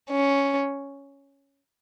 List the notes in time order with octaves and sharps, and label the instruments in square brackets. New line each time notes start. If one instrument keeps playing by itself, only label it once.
[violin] C#4